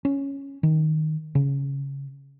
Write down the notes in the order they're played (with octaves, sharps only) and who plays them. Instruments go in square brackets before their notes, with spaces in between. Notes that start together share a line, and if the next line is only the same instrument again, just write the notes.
[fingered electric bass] C#4
D#3
C#3